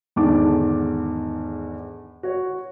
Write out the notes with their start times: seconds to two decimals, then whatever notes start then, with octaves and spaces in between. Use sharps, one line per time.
0.16 E2 G#2 D3 D#3 A5 D6
2.23 F#4 C#5